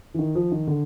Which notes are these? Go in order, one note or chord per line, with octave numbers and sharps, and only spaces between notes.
E3
D#3
F3
D#3
D3